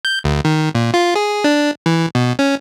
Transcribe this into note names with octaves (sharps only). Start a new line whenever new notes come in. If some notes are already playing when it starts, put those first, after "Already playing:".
G6
D2
D#3
A#2
F4
G#4
D4
E3
B2
C#4